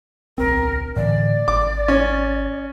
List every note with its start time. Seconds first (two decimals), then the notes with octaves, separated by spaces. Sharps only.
0.38 D1 B1 C4 A#4
0.96 A2 D3 E3 D5
1.48 G#1 D6
1.88 C#4